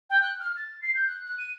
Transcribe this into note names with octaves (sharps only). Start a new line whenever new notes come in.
G5
F#6
F6
A6
C7
G6
F#6
F#6
D#7